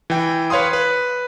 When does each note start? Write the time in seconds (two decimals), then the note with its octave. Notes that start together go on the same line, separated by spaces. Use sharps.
0.10 E3 G5
0.50 B4 C#5 F5 C6 D#6
0.73 B4